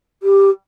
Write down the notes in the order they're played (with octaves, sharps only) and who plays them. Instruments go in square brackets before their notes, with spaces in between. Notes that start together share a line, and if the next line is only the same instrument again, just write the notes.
[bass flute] G4